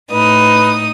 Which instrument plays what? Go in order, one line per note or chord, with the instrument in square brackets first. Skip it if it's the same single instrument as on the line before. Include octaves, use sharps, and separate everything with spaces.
[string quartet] A2 D#4 D#6 [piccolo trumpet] B4